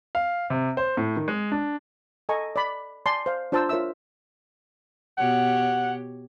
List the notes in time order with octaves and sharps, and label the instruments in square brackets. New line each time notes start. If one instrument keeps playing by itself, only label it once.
[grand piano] F5
C3
C5
A2
D#3
G#3
D4
[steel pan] A4 D#5 G#5 A#5 C#6
D5 B5
D5 G#5 A5 C6
C5 F5
D4 F4 C5 A5 A#5 E6
F4 A#4 C#5 E5 E6
[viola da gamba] B2 G4 C#5 [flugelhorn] F#5